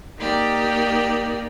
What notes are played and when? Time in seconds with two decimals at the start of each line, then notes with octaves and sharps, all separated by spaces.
0.19 A#3 D#4 G4 D5